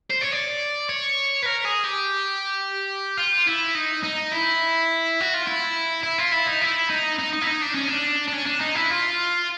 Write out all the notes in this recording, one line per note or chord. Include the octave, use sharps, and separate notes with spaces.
C5
C#5
D5
C#5
B4
A#4
G#4
G4
F4
E4
D#4
D#4
E4
F#4
F4
E4
E4
F4
E4
D#4
E4
D#4
D#4
D#4
E4
D#4
D4
C#4
D4
D4
C#4
D4
D#4
E4
F4